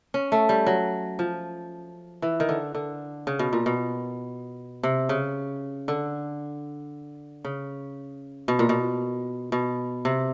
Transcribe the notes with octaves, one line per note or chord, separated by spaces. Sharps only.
C#4
A3
G3
F#3
F3
E3
D#3
D3
D3
C#3
B2
A#2
B2
C3
C#3
D3
C#3
B2
A#2
B2
B2
C3